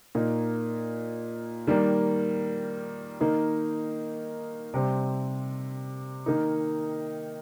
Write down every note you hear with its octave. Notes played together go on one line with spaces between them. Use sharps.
A#2 A#3 D#4
D#3 G3 A#3
D#3 A#3 D#4
C3 G3 C4
D#3 A#3 D#4